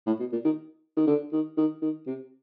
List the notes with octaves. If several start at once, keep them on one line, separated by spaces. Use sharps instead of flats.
A2
B2
A#2
D#3
D#3
D3
D#3
D#3
D#3
C3